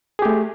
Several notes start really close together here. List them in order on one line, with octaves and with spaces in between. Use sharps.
G#4 G4 A3